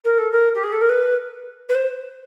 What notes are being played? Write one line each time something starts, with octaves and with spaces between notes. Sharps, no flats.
A#4
A4
A#4
G4
G#4
A4
A#4
B4
B4
C5